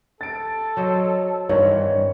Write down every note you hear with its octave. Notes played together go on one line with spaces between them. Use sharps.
A4 A6 D7
F#3 C5 D#5
G2 D#3 E3 C4 C#5